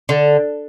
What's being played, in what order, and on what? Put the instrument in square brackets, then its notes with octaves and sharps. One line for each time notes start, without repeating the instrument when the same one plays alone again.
[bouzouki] D3